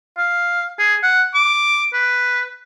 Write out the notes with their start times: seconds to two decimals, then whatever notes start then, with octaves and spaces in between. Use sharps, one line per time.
0.18 F5
0.79 G#4
1.03 F#5
1.34 D6
1.94 B4